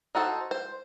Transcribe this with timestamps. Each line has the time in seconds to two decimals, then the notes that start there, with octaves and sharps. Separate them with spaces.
0.15 D#4 F#4 A4 C5
0.51 C5